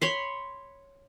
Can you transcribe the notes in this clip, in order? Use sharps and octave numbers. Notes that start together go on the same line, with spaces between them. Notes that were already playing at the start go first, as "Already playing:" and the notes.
C#5 B5 C6